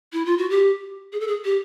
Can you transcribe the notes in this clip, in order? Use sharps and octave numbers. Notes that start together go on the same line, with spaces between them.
E4
F4
F#4
G4
G#4
A4
G#4
G4